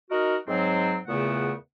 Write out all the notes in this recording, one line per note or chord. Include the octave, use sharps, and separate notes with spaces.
D#4 F#4 A#4
G#2 F#3 C4
E2 A#2 C#3 A3 B3 F#5